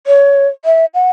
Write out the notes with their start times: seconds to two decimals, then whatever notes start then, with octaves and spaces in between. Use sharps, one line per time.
0.07 C#5
0.65 E5
0.94 F#5